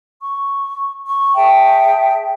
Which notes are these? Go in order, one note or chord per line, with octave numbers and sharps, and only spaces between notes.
C#6
C#6
G#4 E5 G5 A5